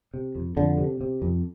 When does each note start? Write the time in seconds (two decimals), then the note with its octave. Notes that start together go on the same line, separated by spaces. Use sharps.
0.14 C3
0.35 F2
0.56 F2 D3
0.78 C3
1.01 C3
1.22 F2